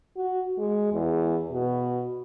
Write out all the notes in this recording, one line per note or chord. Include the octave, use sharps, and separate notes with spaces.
F#4
G#3
E2
B2